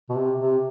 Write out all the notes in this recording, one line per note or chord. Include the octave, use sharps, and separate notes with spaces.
B2
C3
C3